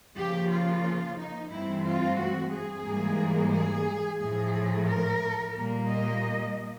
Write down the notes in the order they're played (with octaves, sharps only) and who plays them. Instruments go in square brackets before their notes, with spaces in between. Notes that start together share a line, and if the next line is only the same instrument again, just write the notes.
[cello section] C#3 F3 A#3 G4
F4
D#4
G2 E3 A3 C4 E4
F4
F#4
G#4
G#2 E3 G3 A#3
G#4
A2 F3 A3 G#4
A#4
A#2 G3 A#3
D#5